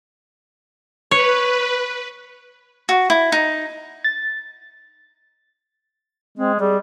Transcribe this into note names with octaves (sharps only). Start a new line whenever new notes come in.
B4 C#5
F#4
E4
D#4
A6
G#3 C4
G3 G#4